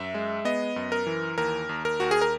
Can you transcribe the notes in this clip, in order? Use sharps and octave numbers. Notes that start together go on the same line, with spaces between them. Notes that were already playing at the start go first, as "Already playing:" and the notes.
Already playing: F#2 E5
G#3
B3 D#5
F#2
A#4
E3
D#2 A#4
D#2
A#4
D#2 F#4
G#4
A#4